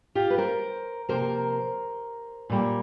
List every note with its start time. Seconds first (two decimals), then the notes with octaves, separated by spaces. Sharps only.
0.15 F4 G4
0.30 B4
0.38 A#4 C5
1.09 C3 F3 A#3 A#4 C5
2.50 A#2 G3 A#3